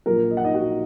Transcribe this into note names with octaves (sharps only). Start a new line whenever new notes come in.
A#1 A#2 F#3 A#3 A#4
D#5
F#5
D#4 D#5
F#4 F#5